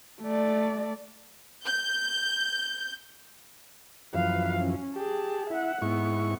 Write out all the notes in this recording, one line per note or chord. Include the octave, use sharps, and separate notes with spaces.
A3 D5
G6
F#2 E3 F3 B4 F5
C#4
G4 G#4 A5
E4 E5 F#5
G#2 B3 E4 C#6